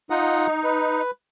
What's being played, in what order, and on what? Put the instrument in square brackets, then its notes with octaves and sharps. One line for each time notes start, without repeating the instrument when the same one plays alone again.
[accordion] D#4 [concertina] F4 D#5 F#5
[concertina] B4